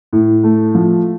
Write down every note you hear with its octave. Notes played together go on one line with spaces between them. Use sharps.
A2
A3
F3